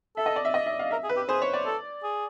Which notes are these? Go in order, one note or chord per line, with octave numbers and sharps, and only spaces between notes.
A4 E5
D#5
D5
E5
D#5
E5
F5
A#4 E5
G#4
B4
G4
G#4 C5
C#5
D5
A4
G#4